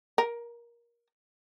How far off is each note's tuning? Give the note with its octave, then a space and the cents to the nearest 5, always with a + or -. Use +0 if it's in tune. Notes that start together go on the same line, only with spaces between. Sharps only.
A#4 +20